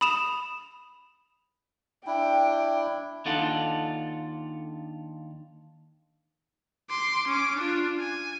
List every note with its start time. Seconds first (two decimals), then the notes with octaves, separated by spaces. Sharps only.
0.01 B5 D#6 E7 F7
2.07 D4 E4 G5
3.25 D#2 D4 D#4 F4 A4 F#5
6.90 C6 D6
7.28 C#4 D6
7.57 D4 F4
7.99 G#5